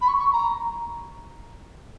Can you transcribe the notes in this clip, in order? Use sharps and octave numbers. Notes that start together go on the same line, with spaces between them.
B5
C#6
C#6
A#5